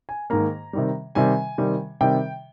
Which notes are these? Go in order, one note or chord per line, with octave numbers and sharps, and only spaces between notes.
G#5
G#2 D#3 A#3 A#5
C3 D#3 G3
C3 D#3 G3 G#5
C3 D#3 G3
C3 D#3 G3 G5